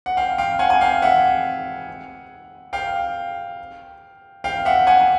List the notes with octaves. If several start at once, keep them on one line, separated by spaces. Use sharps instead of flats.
F#5
F5 G5
F5 G5
F#5 G#5
G#5
F5 G5
E5 F#5
F5 G5
F5 G5
E5 F#5
F#5 G#5